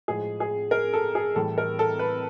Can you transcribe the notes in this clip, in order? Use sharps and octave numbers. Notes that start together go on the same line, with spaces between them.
A2 F3 G#3 G#4
G#4
A#4
A4
G#4
A2 E3 G3 A4
A#4
A4
B4